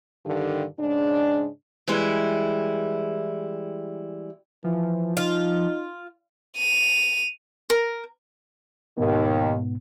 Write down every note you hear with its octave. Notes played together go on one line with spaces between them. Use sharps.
G2 D3 D#3
G#2 C#3 G#3 D4
E3 G3 G#3 E4
E3 F3
D#4 F4
D#7 F7
A#4
D#2 G#2 B2 D#3 B3